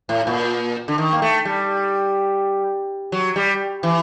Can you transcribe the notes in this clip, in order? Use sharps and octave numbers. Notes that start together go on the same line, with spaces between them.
A2
A#2
D3
D#3
A#3
A3
G3
F#3
G3
E3